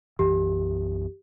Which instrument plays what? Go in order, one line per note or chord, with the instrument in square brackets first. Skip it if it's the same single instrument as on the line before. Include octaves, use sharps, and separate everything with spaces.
[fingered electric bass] B1 F#2 E3 [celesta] G4